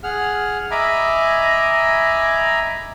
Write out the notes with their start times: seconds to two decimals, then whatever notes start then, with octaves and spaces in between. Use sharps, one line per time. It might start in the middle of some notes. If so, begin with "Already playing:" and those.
0.03 G#4 F#5 F6
0.71 D#5 E5 G#5 A#5 B5 D6